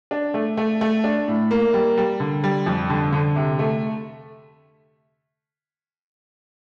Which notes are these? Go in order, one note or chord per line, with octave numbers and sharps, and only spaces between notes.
D4
A3
A3
A3
D4
A2
A#3
G3
G3
D3
G3
F2
D3
D3
C3
A3